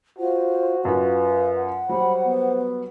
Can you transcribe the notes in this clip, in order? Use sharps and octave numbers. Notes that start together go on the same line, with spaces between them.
F4 F#4 C5
F#2 F4 B4 F5
F#5
F#3 G3 C5 B5
B3